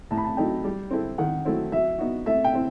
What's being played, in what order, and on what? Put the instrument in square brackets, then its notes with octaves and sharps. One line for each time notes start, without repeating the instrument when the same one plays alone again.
[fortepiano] A2 [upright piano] A5
[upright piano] B5
A5
[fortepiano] F#3 A3 D#4 [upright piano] G5
[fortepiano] G3
C4 E4 A4
[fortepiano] D#3 [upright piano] F#5
[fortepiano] F#3 A3 C4 E4
[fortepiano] F#3 [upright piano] E5
[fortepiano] B3 D#4 F#4
[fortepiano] A3 [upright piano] E5
[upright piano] G5
[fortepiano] C4 E4